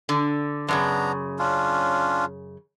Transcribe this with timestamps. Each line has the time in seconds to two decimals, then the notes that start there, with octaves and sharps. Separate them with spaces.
0.09 D3
0.68 F#2 A2 C#3 B3 D4 A#5
1.39 C#4 D4 F4